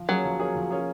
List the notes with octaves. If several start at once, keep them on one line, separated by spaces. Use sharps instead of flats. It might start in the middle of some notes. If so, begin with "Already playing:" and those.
Already playing: F3
F#3 A#3 C#4 G#4
F3
A#3 C#4 G#4
F3
A#3 C#4 G#4